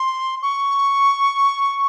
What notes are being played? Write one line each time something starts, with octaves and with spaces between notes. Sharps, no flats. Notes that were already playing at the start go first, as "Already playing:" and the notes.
Already playing: C6
C#6